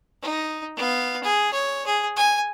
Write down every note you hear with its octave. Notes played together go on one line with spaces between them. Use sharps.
D#4
B3 F5
G#4
C#5
G#4
G#5